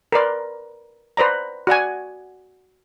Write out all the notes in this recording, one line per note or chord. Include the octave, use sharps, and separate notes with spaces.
A#4 B4 D5 C6
B4 C5 D5 A#5
F#4 D5 F#5 G#5